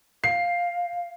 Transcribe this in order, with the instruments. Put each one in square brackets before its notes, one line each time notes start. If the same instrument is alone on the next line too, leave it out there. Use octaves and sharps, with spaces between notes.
[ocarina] F5 [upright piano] C7